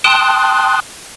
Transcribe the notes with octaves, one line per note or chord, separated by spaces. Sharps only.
G5 A5 C6 D#6 F#6